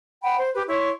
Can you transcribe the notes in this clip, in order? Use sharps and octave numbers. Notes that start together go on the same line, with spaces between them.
F#5 G5 B5
C5
G4 B4
E4 C#5 C6 C#6